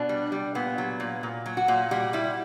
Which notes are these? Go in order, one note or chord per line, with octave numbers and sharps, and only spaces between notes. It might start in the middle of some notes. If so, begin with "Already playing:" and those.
Already playing: B2 D4
G3
G3
A#2 B3
F#3
A#2
A#2
F#3
F#4
A#2
G3 F#4
G3 E4